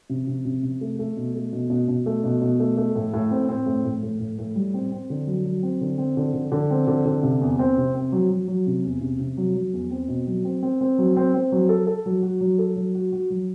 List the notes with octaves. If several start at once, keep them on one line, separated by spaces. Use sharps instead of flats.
C3
C3
C3
C3
A3
A3
B2
A3
B2
B2
B2
A3
B2
B2
A3
A3
A2
A2
C4
C4
A2
A2
A2
A2
A2
G3
C4
C4
D3
F#3
F#3
C4
D3
C4
D3
D3
D3
C4
D3
D3
C3
E2
C4
C3
C4
F#3
F#3
F#3
C3
E2
C3
C3
F#3
F#3
E2
C4
B2
F#3
C4
C4
C4
F#3
C4
C4
F#3
A4
A4
F#3
F#4
F#3
A4
F#3
F#4
F#4
F#3